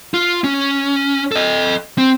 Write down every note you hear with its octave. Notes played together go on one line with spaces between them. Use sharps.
F4
C#4
A4 D#5
C4